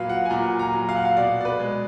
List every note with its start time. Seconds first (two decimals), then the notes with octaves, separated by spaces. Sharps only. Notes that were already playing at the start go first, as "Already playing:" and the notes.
Already playing: A#2 F#3 B4 F5
0.09 F#5
0.25 G#5
0.30 A#2 A#5
0.59 A#5
0.73 F#3
0.89 F5
0.96 F#5
1.05 F5
1.16 B2 D5
1.41 D5
1.45 B4
1.60 G#3